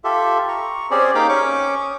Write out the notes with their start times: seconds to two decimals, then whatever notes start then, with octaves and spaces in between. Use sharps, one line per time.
0.04 F4 G4 A4 E5
0.48 A#5 C#6
0.91 C4 C#4 G4 G#4 C5 D5
1.15 A#3 D#4 G4 F5 G5 D6
1.29 C#4 C#6 D6
1.81 D#6